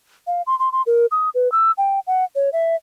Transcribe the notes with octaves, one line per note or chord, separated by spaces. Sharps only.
F5
C6
C6
C6
A#4
D#6
B4
E6
G5
F#5
C#5
E5